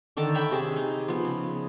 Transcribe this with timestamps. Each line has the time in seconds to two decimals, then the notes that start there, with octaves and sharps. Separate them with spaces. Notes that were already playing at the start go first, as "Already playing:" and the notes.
0.17 D3 D#3 A4 D6
0.34 C#5 E5 G5 B5
0.51 C3 G#4 A5
0.76 D#4
1.08 F3 B3
1.25 C#3